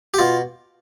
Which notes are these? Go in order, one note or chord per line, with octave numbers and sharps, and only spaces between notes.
G4
B2 F4